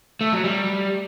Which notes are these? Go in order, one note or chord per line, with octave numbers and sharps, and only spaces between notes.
A3
F#3
G3